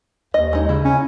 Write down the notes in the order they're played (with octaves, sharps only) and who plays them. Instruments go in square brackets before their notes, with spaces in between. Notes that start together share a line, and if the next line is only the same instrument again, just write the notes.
[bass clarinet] D#2 [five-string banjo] D#5
[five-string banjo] G#3 D#4
[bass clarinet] C#3 [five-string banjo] E4
[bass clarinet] C#4